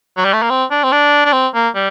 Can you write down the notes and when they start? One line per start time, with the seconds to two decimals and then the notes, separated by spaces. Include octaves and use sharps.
0.17 F#3
0.25 G3
0.33 A3
0.42 A#3
0.50 C4
0.71 D4
0.83 C4
0.92 D4
1.25 D4
1.33 C4
1.54 A#3
1.75 G3